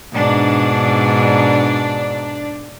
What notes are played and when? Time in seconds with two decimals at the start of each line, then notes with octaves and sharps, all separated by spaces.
0.15 G#2 B2 D4